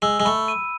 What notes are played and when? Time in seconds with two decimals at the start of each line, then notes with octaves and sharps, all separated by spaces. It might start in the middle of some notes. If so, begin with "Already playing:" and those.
0.02 G#3 E6
0.20 G#3
0.25 A3 B5
0.48 D#7